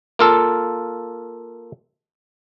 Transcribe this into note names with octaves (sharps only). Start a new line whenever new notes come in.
A#3 F4 A4